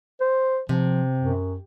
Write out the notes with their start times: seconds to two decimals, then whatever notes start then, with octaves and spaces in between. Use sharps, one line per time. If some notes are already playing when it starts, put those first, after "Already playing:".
0.21 C5
0.69 C3 F3
1.18 F#2